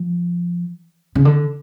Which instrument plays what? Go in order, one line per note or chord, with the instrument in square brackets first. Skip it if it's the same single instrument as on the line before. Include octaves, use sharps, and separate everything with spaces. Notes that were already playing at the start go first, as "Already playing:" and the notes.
Already playing: [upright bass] F3
C#3
D3